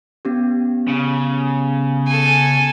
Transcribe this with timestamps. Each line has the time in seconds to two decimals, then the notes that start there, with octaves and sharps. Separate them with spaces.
0.25 B3 C#4 G4
0.88 C#3
2.07 A4 G#5